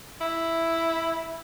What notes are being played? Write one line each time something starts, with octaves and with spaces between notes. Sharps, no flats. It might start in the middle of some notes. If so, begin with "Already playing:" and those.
E4